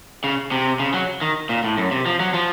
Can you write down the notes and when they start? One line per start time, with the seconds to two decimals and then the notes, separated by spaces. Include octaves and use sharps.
0.24 C#3
0.52 C3
0.80 C#3
0.94 F#3
1.22 D#3
1.49 A#2
1.64 A2
1.78 F#2
1.91 C3
2.06 F3
2.20 F#3
2.34 F3